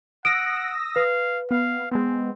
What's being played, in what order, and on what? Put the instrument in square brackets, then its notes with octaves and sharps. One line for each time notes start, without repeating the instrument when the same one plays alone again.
[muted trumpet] F#5 [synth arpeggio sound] D#6 E6 A#6 [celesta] D7
[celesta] B4 [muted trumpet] F5
[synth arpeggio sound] B3 [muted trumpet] F5
[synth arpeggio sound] G#3 B3 [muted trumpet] C4